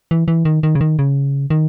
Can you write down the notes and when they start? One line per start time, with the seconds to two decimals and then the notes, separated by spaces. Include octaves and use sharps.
0.11 E3
0.28 E3
0.45 D#3
0.63 D#3
0.75 C#3
0.81 D#3
0.99 C#3
1.50 D#3